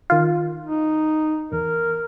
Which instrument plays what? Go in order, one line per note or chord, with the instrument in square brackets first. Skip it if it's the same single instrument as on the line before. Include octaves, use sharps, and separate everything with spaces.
[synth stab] D#3 F4
[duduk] D#4
[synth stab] E2 [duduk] A#4